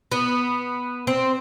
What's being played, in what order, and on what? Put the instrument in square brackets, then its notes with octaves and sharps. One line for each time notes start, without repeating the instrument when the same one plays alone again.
[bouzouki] B3
C4